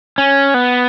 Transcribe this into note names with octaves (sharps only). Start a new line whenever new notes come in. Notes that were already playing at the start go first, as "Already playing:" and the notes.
C#4
B3